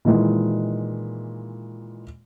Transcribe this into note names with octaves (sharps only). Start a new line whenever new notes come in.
A#2 D#3 E3 G#3